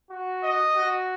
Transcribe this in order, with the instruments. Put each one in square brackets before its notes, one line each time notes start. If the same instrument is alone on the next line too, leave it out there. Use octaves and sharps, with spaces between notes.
[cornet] F#4
[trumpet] D#5
[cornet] F#4